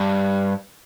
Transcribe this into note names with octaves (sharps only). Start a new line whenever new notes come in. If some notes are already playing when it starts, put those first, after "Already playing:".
Already playing: G2